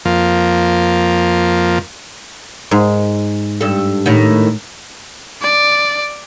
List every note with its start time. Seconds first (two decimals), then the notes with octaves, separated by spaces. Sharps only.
0.05 F2 F3 A#3
2.71 G#2
3.61 G2 A4
4.06 A2 D#3
5.42 D5